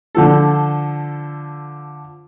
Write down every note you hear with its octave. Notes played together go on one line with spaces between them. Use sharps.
D3 F3 A4